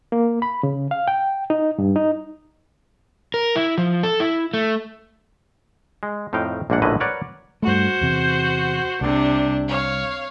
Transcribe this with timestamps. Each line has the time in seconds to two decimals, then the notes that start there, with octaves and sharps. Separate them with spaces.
0.12 A#3
0.42 B5
0.63 C#3
0.91 F5
1.08 G5
1.50 D#4
1.78 G2
1.96 D#4
3.34 A#4
3.56 E4
3.78 F3
4.03 A4
4.20 E4
4.54 A3
6.03 G#3
6.33 F2 A2 D#4 F5 G5
6.70 A#1 G#2 A#3 D4 F#5
6.82 A#1 A2 D3 C#4 B4 D#5
7.00 A#4 B4 C#5 D5 F#5
7.62 G2 A3 F#4 C5
8.01 E2 C3
9.01 C2 C3 D4
9.67 C#5 F5